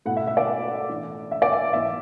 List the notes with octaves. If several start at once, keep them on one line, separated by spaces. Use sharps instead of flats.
B2 A3 E4 F#5
E5
E5
D5
A2 E3 D4
E5
D5
E5
E3 B3 E4 E5